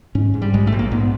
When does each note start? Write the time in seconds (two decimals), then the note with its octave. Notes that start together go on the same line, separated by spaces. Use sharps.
0.15 G#2 C#4
0.34 G#2
0.42 G3
0.53 A#1 G#3
0.67 A3
0.72 A#1
0.79 A#3
0.91 G#2 B3